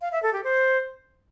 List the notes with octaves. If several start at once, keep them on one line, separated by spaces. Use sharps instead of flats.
F5
E5
A4
G4
C5